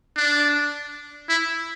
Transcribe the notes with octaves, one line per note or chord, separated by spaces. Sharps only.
D4
E4